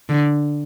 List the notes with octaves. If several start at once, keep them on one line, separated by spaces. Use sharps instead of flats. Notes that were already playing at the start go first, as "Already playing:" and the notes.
D3